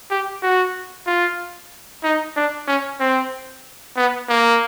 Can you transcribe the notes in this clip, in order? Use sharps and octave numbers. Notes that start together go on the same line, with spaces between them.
G4
F#4
F4
D#4
D4
C#4
C4
B3
A#3